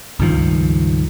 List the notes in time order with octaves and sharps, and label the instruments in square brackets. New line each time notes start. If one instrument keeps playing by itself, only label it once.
[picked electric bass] C#2 G2 D#3 F3